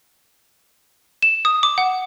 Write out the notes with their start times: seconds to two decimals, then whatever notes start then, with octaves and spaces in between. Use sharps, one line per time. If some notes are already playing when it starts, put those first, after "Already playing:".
1.23 E7
1.45 D#6
1.63 D6
1.78 F#5